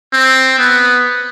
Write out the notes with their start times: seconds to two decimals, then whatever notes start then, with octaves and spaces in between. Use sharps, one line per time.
0.13 C4
0.58 B3